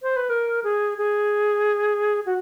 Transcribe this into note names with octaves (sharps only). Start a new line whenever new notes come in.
C5
B4
A#4
G#4
G#4
F#4